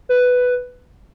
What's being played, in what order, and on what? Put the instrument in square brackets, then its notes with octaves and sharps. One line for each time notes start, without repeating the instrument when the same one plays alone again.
[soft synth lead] B4